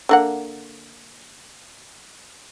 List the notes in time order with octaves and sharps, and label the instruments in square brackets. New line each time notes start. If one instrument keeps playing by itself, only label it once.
[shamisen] D3 A#3 F#5